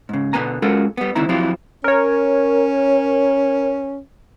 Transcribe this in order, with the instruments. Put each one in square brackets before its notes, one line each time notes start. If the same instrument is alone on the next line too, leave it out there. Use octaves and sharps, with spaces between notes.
[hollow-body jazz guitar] G#2 C#3
B2 D3 E3 B3 G#5 A#5
G#3 C#4 F4 F#4 A4 A#4
G3 B3
C#2 D3 D#3 C4 E4 A#5
F3 F#3 C4 E4 F4 G4
[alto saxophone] C#4 [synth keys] A#4 C#5